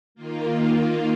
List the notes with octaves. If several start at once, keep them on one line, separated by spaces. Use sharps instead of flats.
D#3 A#3 F4